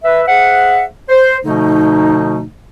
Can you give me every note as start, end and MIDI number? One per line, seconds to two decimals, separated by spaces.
0.04 0.22 71
0.04 0.22 76
0.27 0.84 68
0.27 0.84 72
0.27 0.84 76
0.27 0.84 78
1.09 1.37 72
1.44 2.43 47
1.44 2.43 50
1.44 2.43 53
1.44 2.43 57
1.44 2.43 63